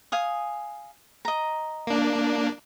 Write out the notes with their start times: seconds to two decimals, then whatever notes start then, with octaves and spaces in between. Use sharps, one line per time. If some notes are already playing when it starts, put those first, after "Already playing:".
0.12 F5 G#5 D#6
1.25 D#5 A#5
1.87 A#3 D4